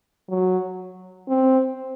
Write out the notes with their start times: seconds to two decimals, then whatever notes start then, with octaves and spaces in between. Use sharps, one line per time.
0.30 F#3
1.28 C4